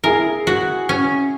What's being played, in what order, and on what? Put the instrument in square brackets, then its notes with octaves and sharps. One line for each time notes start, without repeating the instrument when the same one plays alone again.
[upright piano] E4 G#4 [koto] A#4
[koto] F#4
C#4